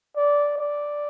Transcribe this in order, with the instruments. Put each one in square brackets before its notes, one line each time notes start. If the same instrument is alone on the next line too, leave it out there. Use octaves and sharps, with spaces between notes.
[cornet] D5
D5